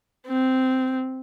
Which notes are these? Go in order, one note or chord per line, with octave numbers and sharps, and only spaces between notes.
C4